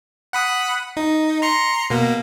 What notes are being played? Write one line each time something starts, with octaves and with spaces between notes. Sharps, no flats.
F#5 B5 D#6
D#4
A#5 C6 C#7
B2 A#3